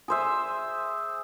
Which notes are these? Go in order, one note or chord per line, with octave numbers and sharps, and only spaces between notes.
G#4 C5 E5